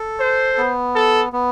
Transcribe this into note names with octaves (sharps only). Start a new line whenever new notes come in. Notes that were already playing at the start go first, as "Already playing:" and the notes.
Already playing: A4
C5
B3
A4
B3